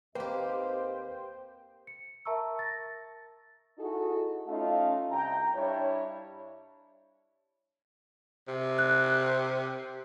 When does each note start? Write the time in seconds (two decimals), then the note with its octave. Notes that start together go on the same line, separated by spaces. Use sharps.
0.15 D#2 A#3 C4 G4 B4 C5 D#5 G5
1.87 C#7
2.26 A#4 E5 A5 A#5 C#6 E6
2.59 A6 A#6
3.79 D#4 E4 F#4 G#4 A4
4.48 A3 C#4 D#4 F4 F5
5.11 C2 G5 A#5
5.55 G2 D4 E4 C#5
8.48 C3
8.79 F#6